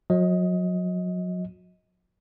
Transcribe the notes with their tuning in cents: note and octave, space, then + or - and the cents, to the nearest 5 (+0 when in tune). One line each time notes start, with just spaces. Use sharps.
F#3 -35 D#5 +20